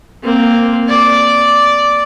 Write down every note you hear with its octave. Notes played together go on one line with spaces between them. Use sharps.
A#3 C4
D5